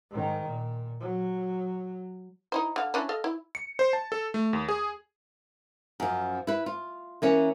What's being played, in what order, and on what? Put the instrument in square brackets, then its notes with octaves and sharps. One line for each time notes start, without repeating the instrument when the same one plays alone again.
[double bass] G#2 D#3
A#2
F#3
[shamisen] D#4 E4 C5
D3 F5
C#4 D4 E4
A4 D#5 F5
E4
[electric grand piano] C#7
C5
A5
A4
A3
D#2
G#4
[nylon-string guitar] F#2 F3
E4 B4
F4
E3 A#3 C#4